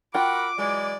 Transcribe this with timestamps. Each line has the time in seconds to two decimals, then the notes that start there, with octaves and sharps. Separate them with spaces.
0.15 F4 F#4 A#4 F#5 G5 B5 D6
0.58 E3 F#3 G#3 D5